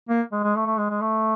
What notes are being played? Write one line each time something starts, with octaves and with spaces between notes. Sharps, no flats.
A#3
G#3
G#3
A3
A3
G#3
G#3
A3